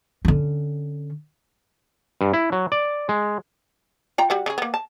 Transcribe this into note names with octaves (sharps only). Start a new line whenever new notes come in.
D3 C#4
G2
E4
F#3
D5
G#3
F4 G5 A#5
G3 F#4 F#5
C#3 G#4
A#3 B3
A5